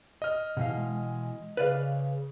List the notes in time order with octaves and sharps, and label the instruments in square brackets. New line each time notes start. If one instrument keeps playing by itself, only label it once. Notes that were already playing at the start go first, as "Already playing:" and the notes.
[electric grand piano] D#5 F6
[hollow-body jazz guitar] B2 E3 F5
[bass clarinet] G#3
[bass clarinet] C#3 [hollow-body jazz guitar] B4 D5 F5